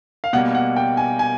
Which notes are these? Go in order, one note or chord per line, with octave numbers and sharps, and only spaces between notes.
F5
B2 G3 A#3 F#5
F#5
G5
G#5
G#5